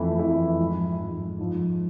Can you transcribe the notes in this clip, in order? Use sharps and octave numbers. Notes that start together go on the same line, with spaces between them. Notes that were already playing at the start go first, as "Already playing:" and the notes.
Already playing: F2 E3 A3 E4
F2 E3 A3 E4
G#2 F3 G#3
G#2 F3 G#3
G#2 F3 G#3